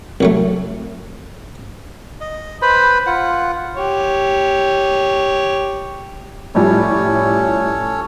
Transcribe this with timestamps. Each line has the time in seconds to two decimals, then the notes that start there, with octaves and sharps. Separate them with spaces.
0.21 C2 F#3 A3
2.21 D#5
2.62 B4 C5 B5
3.06 F4 F#5
3.77 G4 C#5
6.55 A2 F3 G3 C#4 A4 C#5